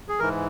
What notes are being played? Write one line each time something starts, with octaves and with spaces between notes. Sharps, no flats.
G#4
G#2 E3 A#4